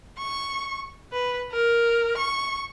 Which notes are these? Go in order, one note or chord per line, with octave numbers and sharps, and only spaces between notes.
C#6
B4
A#4
C#6